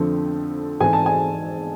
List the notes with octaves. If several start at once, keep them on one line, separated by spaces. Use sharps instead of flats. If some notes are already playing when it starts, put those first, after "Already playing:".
Already playing: F2 D3 F3 A3 C4
G#2 E3 A3 C4 G#5
A5
G#5